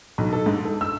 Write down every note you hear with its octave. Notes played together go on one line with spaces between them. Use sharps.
B1
A4
G#2
A4
E6